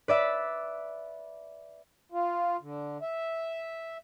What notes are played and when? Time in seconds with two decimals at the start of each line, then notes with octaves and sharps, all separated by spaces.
0.08 B4 D5 E5
2.12 F4
2.61 D3
3.02 E5